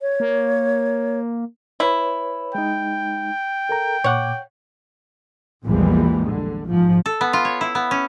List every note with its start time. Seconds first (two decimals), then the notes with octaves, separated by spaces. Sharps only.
0.02 C#5
0.20 A#3
1.80 E4 B4 C#5
2.55 G#3 D#4 G5
3.69 A4 A#4 A#5
4.04 A#2 C#5 F#5 D6
5.64 A#1 E2 A#2 E3 G3 G#3
6.26 D3
6.68 G#2 F3
7.06 A4
7.21 B3
7.33 F4
7.45 C#5
7.61 E4
7.75 B3
7.91 C#4